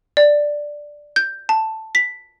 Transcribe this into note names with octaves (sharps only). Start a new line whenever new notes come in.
D5
G6
A5
B6